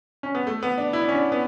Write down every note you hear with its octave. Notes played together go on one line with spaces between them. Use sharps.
C#4
B3
A3
B3
D4
E4
D4
C#4
D4
B3